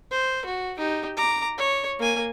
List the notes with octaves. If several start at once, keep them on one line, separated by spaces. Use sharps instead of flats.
C5
F#4
D#4 G4
A#5 D6
C#5
A#3 G#5